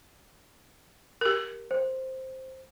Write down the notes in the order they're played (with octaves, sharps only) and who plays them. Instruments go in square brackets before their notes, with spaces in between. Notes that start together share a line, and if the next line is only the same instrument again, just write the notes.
[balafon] G4 A#4
[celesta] C5